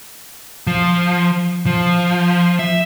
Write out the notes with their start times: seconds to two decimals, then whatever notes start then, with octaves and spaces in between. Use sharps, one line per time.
0.67 F3
1.66 F3
2.59 E5